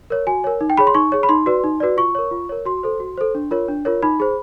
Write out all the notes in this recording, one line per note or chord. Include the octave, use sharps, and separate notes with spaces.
A#4 C#5
F#4 G#5
A#4 C#5
D#4
G5
G#4 C#5 B5
C6
D#4 C#6
G#4 C#5
B5
D#4 C6
F#4 B4 D5
D#4
F#4 B4 D5
F4 C#6
A#4 C#5
F4
A#4 C#5
F#4 C6
A4 C5
F#4
A4 C5
D4
F4 A#4 C#5
D4
F4 A#4 C#5
D#4 B5
G#4 C5